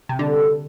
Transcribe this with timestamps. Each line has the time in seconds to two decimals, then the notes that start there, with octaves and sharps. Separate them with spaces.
0.09 C3
0.19 D3 G3 D4 A4